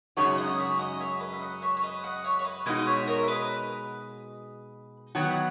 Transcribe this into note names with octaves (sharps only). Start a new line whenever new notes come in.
F#2 C#3 G#3 D#4 F#4 C#5 E5
D#5 F#5
C#5 E5
D#5 F#5
C#5 E5
B4 D#5
E5
D#5 F#5
C#5 E5
C#5
B4 D#5
D#5 F#5
C#5 E5
C#5
B4 D#5
B2 G#3 D#4 F#4 B4 D#5
C#5 E5
A#4 C#5
E5
B4 D#5
D#3 F#3 B3 F#4
F#5
E5